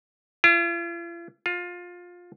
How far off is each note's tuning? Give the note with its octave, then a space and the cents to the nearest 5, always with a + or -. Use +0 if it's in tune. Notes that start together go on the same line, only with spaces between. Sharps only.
F4 -45
F4 +20